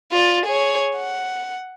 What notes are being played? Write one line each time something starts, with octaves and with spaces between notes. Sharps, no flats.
F4 D5
G#4 C#5
F#5